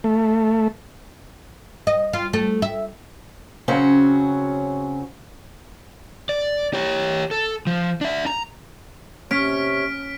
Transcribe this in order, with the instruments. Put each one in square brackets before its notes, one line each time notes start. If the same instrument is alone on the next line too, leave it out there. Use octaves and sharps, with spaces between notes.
[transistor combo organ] A3
[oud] D#5
F4
A3
E5
[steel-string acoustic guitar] C#3 F#3 C4 C#4 F#4
[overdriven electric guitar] D5
G4 C#5
A4
F3
D4 E5
A#5
[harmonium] C3 C#5 [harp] C#4 [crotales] F6 B6 D7